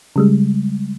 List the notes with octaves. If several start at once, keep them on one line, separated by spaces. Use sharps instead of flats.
C#3 G3 G#3